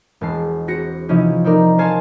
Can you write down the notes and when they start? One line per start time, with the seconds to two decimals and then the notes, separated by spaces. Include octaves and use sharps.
0.21 E1 G#3 A5 C7
0.68 C4 F#4 A#6 C#7
1.09 C3 E3 F3 C#4 D#4
1.44 C4 D#4 A#4 D5
1.78 C5 C#5 F5 G#5 A5 C6